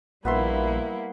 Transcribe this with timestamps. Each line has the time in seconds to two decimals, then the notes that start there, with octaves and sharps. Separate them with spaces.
0.25 A#1 G3 A#3 B3 E4 E5 C6